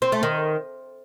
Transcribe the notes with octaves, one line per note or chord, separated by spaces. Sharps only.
C4
A3
D#3